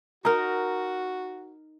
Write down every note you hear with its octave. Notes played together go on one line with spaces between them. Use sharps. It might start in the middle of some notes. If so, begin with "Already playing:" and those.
D#4 F#4 A#4